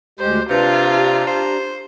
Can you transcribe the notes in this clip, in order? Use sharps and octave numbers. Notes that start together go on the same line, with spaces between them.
D2 G#3 G4 C5
C3 D4 F4 B4 A#5
G4
C5